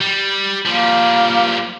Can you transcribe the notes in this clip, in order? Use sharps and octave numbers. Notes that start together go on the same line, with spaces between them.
G3
F3 G3 A#3